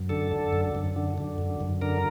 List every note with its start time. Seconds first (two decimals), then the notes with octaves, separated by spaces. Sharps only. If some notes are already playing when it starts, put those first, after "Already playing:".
Already playing: F#2
0.09 D3 A4
0.32 D3
0.53 F#2
0.75 F#2
0.96 D3
1.18 D3
1.38 F#2
1.61 F#2
1.82 D3 A#4